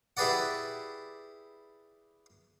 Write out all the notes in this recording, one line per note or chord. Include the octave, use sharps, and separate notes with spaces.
E4 G4 G#4 B4 D5 F#5